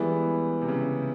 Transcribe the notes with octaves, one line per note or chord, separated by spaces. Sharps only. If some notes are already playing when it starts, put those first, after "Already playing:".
Already playing: E3 G3 G#3 B3 E4
C3
C#3